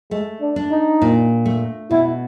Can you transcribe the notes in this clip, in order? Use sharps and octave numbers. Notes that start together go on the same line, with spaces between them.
G#3 A3
D4
D4
D#4
A#2
A3
B2 E4